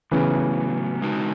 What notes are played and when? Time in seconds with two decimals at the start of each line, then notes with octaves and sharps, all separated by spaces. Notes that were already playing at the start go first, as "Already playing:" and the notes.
0.11 A2 C#3 E3 F#3 B3
1.02 B2 G#3 D#4 F#4